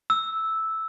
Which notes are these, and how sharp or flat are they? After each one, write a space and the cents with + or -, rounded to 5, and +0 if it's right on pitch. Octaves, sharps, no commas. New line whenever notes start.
E6 -5